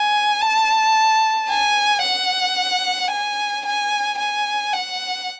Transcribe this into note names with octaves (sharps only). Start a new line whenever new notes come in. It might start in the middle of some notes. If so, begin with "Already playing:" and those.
Already playing: G#5
A5
G#5
F#5
G#5
G#5
G#5
F#5